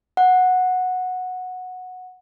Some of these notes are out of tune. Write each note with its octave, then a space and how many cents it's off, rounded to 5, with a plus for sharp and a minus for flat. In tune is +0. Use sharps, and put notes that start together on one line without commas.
F#5 -10